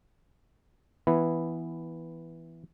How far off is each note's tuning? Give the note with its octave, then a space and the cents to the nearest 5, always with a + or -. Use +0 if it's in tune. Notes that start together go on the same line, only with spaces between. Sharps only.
E3 +0 B3 +0 E4 +0